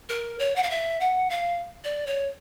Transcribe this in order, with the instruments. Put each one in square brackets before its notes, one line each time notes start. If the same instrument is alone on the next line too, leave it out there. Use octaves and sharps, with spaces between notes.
[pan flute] A#4
C#5
F#5
F5
E5
F#5
F5
D5
C#5